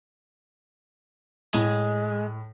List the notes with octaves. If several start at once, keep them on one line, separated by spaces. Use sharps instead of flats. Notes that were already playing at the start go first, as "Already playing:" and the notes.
A2 G#3